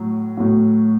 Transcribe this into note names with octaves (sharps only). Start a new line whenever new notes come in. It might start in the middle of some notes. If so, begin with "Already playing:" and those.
Already playing: A2 F#3
A2 F#3